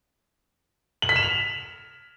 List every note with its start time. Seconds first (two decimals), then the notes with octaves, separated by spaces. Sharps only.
1.02 F#7
1.09 B6
1.16 E7
1.23 F7